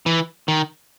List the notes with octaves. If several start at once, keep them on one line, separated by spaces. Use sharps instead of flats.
E3
D#3